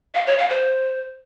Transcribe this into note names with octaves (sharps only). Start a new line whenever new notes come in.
F5
C#5
F5
C5